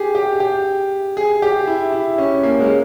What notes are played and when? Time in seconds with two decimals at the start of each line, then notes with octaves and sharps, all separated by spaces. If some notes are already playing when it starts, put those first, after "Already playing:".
Already playing: G4 G#4
0.15 G4
0.40 G4
1.17 G#4
1.42 G4
1.67 E4
1.93 E4
2.18 C#4
2.43 A#3
2.60 G#3